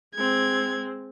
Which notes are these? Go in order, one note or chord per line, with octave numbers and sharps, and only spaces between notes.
G#3 C4 G#6